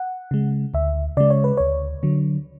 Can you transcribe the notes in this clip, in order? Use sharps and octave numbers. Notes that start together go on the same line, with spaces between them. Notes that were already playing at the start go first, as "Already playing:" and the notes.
Already playing: F#5
C#3 G#3
D2 E5
C#3 G#3 D5
C#5
B4
D2 C#5
D3 F#3